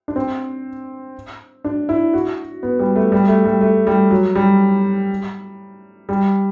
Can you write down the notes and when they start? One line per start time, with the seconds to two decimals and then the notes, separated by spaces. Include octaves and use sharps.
0.08 D4
0.16 C4
1.64 D4
1.89 E4
2.13 F#4
2.63 B3
2.79 G3
2.96 A3
3.12 G3
3.28 A3
3.45 G3
3.61 A3
3.87 G3
4.10 F#3
4.35 G3
6.09 G3